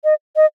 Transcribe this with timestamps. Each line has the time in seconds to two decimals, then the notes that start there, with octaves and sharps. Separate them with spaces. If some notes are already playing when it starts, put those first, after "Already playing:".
0.04 D#5
0.36 D#5